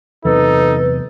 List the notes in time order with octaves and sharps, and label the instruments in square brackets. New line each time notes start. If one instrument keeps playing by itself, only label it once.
[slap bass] E2 C3 F#3 [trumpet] D#4 [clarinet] A4 [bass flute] B4